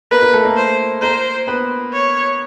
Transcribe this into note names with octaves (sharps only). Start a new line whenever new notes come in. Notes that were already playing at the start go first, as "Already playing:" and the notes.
A#3 A#4 B4
A#3 A#4
A3 A4
A#3 A#4
C5
A#3 A#4 C5
B3 B4
C#5